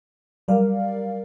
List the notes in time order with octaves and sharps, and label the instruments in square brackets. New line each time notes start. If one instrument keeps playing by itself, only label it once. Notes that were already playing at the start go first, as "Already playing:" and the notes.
[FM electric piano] F#3 G3 A#4 D5 F5